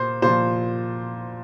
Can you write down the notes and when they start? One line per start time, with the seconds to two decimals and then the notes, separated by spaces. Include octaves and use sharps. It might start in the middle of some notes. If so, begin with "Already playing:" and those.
Already playing: A#2 C5
0.22 A#2 F3 C5